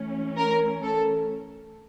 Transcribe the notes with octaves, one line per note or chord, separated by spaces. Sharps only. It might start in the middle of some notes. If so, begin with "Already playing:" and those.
Already playing: E3 A3 C#4
A#4
A4